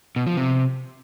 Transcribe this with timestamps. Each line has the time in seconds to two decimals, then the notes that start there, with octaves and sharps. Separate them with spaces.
0.16 B2
0.27 F3
0.37 C3